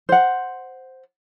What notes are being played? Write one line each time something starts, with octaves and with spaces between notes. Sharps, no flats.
C5 F#5